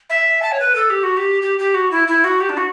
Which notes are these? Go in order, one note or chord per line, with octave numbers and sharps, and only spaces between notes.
E5
A5
C#5
B4
A4
G4
F#4
G4
G4
G4
F#4
E4
E4
F#4
G4
D4
F#4